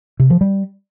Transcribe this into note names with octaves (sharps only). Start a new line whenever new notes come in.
C3
F3
G3